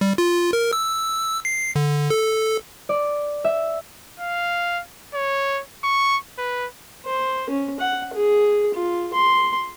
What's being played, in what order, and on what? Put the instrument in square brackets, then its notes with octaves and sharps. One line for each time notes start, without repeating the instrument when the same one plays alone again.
[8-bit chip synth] G3
F4
A#4
E6
C7
D3
A4
[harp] D5
E5
[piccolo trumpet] F5
C#5
C#6
B4
[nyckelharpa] C5
C#4
F#5
G#4
F4
C6